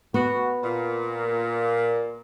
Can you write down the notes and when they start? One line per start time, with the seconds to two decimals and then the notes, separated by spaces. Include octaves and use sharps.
0.14 B3 F#4
0.64 A#2